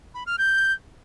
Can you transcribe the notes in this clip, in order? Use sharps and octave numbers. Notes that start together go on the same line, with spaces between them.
B5
F6
G6